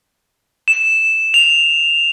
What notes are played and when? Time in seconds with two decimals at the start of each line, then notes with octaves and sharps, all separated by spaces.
0.68 E7
1.34 F7